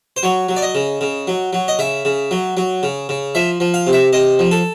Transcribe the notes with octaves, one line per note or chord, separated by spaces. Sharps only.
C5
F#3 C#5
F#3
D5
D#5
C#3
C#3
F#3
F#3
D#5
C#3 E5
C#3
F#3
F#3
C#3
C#3
F3 E5
F3
F5
C3
E5
C3 D#5
F3
A4